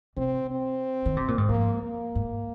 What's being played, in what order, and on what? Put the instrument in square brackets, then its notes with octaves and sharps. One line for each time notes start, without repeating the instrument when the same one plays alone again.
[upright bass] C3 [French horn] C4
[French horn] C4
[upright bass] D#3
C3
A#2
G#2
[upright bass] F2 [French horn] A#3
[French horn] A#3
[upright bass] G#2